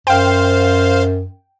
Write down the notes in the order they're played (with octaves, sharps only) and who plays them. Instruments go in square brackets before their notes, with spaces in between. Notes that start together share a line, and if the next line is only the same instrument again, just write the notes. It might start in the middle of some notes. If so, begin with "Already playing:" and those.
[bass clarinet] F#2 [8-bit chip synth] C5 F5 [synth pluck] G5